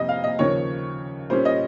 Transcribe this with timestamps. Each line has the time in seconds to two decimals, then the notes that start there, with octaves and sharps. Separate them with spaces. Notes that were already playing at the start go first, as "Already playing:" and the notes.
Already playing: F2 C3 G3 D#5
0.09 F5
0.24 D#5
0.39 D#2 C#3 F3 C#5
1.30 A#2 G3 C#4 C5
1.45 D#5